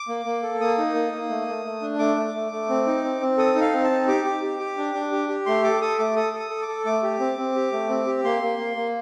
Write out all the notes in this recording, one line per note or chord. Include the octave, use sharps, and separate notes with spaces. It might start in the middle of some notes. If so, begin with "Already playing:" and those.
Already playing: D6
A#3
A#3
A4
A#3 D#6
D#4
A#3
A#3
A3
A3
A3
D4
A3 D6
A3
A3
A3
C4
D#4
C4
C4
A4 D#6
D#4
F5
C4
A5
D#4
G4 D6
G4
G4
G4
D4
D4
G4
G4
A3 C6
A4 D6
A4 D#6
A3 D6
A4 D#6
A4
D#6
A4
D6
A4
A3 D6
G4
C4
C4
G4
A3
C4
G4
A#3 C6
A#3
A#3
A#3